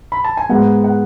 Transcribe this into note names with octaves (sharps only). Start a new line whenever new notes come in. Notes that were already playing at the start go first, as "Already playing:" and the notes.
B5
A5
G#5
G#2 G#3 B3 F#5
F#5